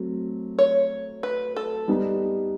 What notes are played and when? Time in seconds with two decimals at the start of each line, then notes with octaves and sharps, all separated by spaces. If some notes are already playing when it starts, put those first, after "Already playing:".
Already playing: F#3 A3 C4
0.59 C#5
1.23 B4
1.56 A4
1.88 G3 B3 D#4